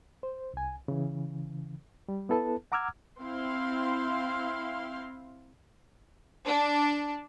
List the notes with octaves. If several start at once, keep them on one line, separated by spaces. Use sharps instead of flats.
C5
C2 G#5
C#3 E3
G3
B3 E4 A4 B4 A5
F#5 A#5 D6 E6 F6 G#6
C4 E4 F5 C6
D4